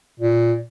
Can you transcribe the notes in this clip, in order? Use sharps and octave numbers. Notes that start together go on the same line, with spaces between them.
A#2